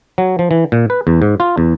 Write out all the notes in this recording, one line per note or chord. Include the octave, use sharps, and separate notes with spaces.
F#3
F3
E3
A#2
B4
E2
G#2
F4
E2